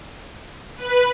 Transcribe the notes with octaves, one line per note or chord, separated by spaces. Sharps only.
B4